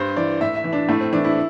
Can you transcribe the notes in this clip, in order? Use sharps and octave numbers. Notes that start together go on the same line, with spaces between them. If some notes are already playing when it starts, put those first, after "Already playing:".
Already playing: G2 C5
E3 D5
A2 E5
E5
E3
D4
A2 A3
C4
E3 D4
E4